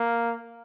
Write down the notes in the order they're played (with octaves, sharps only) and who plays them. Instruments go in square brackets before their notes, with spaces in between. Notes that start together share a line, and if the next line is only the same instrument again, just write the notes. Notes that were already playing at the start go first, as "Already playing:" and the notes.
Already playing: [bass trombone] A#3